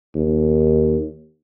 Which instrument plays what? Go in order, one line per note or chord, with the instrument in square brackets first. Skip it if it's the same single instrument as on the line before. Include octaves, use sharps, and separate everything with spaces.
[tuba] D#2